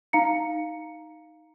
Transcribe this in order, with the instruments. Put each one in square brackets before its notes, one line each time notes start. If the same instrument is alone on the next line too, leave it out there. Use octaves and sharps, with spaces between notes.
[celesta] D#4 F5 A#5 C#7